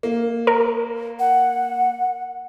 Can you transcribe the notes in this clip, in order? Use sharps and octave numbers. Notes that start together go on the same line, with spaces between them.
A#3
A#4
F#5